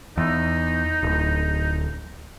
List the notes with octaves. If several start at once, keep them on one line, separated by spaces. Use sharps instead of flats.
E2 D#4
D1